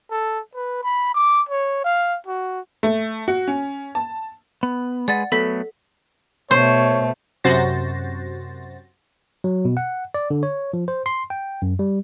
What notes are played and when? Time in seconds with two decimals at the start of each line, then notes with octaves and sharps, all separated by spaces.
0.11 A4
0.55 B4
0.83 B5
1.14 D6
1.49 C#5
1.84 F5
2.27 F#4
2.83 A3
3.28 F#4
3.48 C#4
3.95 A5
4.63 B3
5.08 G#3 G#4 B4 D5 F#5 A6
5.32 F#3 A3 B3 A4 B6
6.51 B2 A3 C5 C#5
7.44 F#2 C3 F#4 C5 A6 A#6
9.44 F#3
9.65 B2
9.77 F#5
10.14 D5
10.30 D3
10.43 C#5
10.73 F3
10.88 C5
11.06 C6
11.30 G5
11.62 F#2
11.79 G3